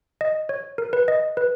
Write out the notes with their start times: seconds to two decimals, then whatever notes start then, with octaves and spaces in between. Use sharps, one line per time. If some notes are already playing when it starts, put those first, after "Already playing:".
0.21 D#5
0.49 C#5
0.78 A#4
0.93 B4
1.08 D#5
1.37 B4